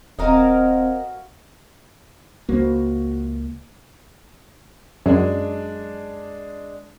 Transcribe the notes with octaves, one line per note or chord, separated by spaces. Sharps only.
D#1 C4 F#4 A#4 D#5 F5 G#5
C#2 A#3 F#4 C5
F#2 G#3 D4